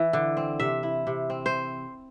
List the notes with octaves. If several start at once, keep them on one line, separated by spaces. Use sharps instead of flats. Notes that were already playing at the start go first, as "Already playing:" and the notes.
Already playing: E3
D3
C4
C3 E5
E4
C3
C4
C5